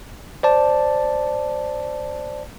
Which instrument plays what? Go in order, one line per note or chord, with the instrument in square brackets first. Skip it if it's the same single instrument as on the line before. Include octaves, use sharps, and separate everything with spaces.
[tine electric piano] C5 D5 A5